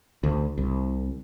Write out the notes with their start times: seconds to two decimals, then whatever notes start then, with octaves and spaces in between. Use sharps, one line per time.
0.23 D2
0.58 C2